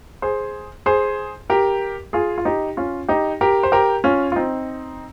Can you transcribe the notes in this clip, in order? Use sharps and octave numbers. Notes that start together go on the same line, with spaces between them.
G#4 C5
G#4 C5
G4 A#4
F4 G#4
F4
D#4 G4
C#4 F4
D#4 G4
G4 A#4
C5
G4 A#4
C#4 F4
F4
C4 D#4